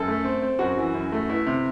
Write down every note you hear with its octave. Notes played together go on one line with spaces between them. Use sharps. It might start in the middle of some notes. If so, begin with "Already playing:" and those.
Already playing: F#2 A4
A3
C4
C4
F#2 F#4
E3
F#2
A3
B3 E4
C3